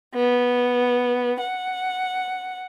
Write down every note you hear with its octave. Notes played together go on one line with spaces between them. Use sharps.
B3
F#5